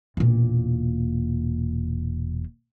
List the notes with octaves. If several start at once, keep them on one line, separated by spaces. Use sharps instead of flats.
E1 A#2